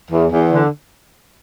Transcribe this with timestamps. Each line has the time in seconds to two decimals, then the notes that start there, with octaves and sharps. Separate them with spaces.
0.11 E2
0.31 E2
0.52 D3